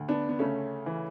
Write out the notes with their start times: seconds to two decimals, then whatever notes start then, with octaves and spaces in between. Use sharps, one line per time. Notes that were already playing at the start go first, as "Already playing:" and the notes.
Already playing: D2
0.08 B3 D4
0.29 B3
0.39 C#3 A3 C#4
0.86 E3